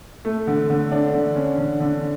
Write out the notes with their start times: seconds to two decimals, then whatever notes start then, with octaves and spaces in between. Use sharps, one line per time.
0.25 A3
0.47 D3
0.70 D3
0.92 D4
1.14 D3
1.36 C#4
1.58 D3
1.80 D3